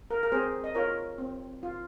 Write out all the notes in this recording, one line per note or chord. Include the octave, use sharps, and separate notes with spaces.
A#4
A#4
C4 G#4 C5
D#5
F4 A#4 C#5
C4
F4